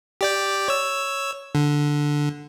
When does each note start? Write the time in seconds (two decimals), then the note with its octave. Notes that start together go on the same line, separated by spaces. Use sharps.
0.21 G4 D5 G5
0.68 C#5 E6
1.55 D3